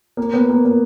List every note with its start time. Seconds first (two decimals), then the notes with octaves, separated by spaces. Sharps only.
0.17 A#3
0.34 B3
0.49 A#3
0.65 A#3